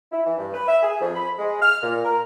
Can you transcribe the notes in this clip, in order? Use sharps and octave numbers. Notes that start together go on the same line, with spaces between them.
E4
E3
G2
B4
E5
G#4
F2
B5
G#3
F6
A#2
A#4